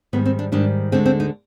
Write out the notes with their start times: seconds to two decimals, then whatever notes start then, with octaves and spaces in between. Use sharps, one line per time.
0.13 G#2 D#3 G3 B3
0.26 C4
0.39 D4
0.52 G#2 D#3 G3 D4
0.92 D2 D3 G#3 C4
1.06 C4
1.20 D#4